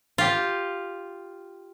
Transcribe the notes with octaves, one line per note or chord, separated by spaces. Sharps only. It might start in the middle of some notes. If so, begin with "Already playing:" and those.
F4 G4